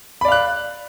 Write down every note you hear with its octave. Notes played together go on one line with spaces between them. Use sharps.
D5 F5 B5 F#6